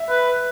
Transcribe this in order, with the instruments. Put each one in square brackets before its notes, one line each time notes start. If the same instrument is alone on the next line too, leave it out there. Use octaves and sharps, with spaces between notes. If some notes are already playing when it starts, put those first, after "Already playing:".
Already playing: [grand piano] E5
[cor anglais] B4